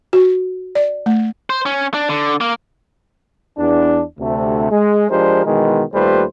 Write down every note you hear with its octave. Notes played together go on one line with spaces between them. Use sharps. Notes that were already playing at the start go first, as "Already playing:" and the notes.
F#4
D5
A3
C5
C#4
D4
D3
A#3
E2 D4
D2 C3 A3
G#3
F3 G#3 D4 G4 A#4 C5
B2 D#3 E3 G#3
D#2 G3 A3 F4 B4 C5